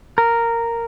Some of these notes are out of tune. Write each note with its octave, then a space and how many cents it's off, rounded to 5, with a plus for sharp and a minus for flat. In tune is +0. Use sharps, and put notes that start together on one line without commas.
A#4 -5